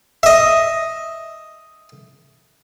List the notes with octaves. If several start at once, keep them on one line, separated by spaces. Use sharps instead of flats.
D#5 E5